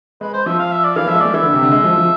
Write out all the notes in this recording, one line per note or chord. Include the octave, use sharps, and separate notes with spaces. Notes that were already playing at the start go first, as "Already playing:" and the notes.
G#3 B4
C5
F3 E5
F5
E5
D5
E3 F5
F3 E5
G#3
A3 D5
E3 E5
D3
C3
D3
G#3
F3
F3